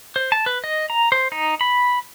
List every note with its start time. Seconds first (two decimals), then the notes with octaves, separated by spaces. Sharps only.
0.16 C5
0.32 A5
0.46 B4
0.64 D#5
0.90 A#5
1.12 C5
1.32 D#4
1.61 B5